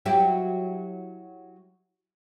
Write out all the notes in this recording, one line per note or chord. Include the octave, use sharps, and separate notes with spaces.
F#3 E4 G4